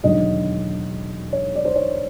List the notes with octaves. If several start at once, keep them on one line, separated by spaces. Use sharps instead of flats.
E1 D#2 D3 F#3 D#5
C#5
D5
C5
C#5